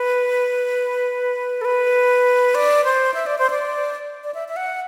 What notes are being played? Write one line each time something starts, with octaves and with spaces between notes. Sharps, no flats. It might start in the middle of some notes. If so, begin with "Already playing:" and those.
Already playing: B4
A4
B4
D5
C5
E5
D5
C5
D5
D5
E5
E5
F#5